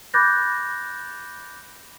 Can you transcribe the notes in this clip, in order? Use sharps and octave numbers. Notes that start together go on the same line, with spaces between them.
B5 D6 F#6 G6 A6 A#6